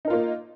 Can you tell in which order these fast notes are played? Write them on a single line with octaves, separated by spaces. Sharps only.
D#4 A#4 F4 A#3